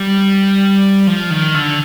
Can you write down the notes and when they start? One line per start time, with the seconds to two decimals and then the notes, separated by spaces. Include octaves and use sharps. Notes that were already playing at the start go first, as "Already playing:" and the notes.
Already playing: G3
1.07 F3
1.30 D#3
1.54 D3